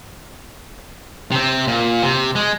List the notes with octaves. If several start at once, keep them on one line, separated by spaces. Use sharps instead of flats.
C3 C4
A#2
C3
G#3